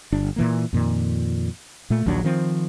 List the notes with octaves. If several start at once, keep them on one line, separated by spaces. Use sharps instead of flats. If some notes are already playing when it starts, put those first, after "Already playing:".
G1 D4
A#2 E3 A#3
F2 A#2 D#3
A#2 A3
A#1 D#2 F#3 D4
D#3 F3 C4